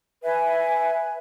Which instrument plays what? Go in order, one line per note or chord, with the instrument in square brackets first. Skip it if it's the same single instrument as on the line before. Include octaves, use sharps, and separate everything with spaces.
[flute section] B4 E5 G#5